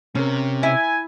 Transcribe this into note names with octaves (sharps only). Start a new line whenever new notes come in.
C3 C#4 A#4
E4 G#5